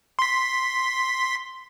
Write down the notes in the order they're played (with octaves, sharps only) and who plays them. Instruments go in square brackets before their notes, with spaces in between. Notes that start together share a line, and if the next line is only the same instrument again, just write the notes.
[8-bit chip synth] C6 B6